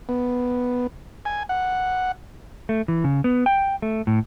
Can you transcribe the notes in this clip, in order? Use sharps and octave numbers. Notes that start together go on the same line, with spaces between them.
B3
G#5
F#5
A3
E3
C#3
B3
G5
A3
A2